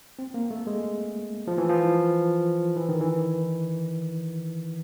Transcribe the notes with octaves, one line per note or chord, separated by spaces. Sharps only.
C4
A#3
A3
G#3
F3
E3
F3
E3
D#3
E3